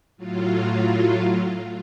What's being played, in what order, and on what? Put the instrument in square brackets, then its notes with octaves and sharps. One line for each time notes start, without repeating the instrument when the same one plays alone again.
[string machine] A2 F#3 F4